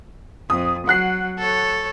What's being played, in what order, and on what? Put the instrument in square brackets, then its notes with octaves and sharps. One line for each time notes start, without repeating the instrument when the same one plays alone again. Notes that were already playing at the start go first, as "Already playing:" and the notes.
[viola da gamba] F2 [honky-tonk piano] D#6
[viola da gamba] F#3 [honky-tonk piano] F#5 F#6 C7
[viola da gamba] A4 C#5